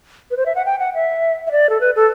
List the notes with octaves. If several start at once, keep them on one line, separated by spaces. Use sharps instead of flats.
B4
C5
E5
F#5
G5
F#5
E5
E5
D5
A4
B4
A4